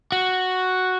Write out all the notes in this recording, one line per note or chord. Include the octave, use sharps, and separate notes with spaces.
F#4